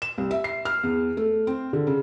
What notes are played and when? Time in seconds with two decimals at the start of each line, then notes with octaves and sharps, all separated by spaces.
0.02 E7
0.18 C2
0.31 E5
0.44 C7
0.65 F6
0.83 E2
1.17 A3
1.47 C4
1.73 D3
1.87 C#3